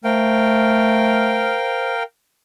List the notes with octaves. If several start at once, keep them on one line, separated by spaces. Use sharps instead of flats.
A3 A#4 C5 F5 G5